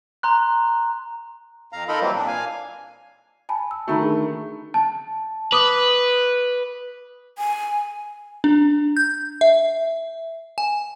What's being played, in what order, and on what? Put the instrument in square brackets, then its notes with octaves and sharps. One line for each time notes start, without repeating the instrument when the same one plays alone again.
[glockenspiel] A#5 C6 F#6
[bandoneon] F2 F5 A#5
D#4 F4 A4 A#4 D#5 B5
E3 F#3 G3 A#3 C4
A#2 D4
F5 G#5
[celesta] G#5 A5 B5
E6
[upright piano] D#3 A3 [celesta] F#4 A#5 B5
[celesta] D4 G#4
A5
[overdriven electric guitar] B4 [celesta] D6 D#6
[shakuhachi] G#5
[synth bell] D4
G6
E5
G#5